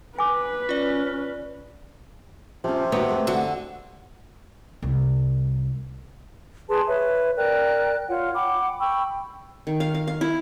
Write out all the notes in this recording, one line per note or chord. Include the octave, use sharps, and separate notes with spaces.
B4 G#5 D6
C#4 F4 D5
C3 F3 C#4
D#3 A#3 B3 F#4 C#5
F2 A3
D3 F#4
C2
G#4 B4 A5 C6
B4 C#5 E5
A#4 D5 G5 F#6
F4 C#5 F#5
F#5 G5 B5 D6
G5 B5 C#6 E6
D#3
F5
F5
F5
E4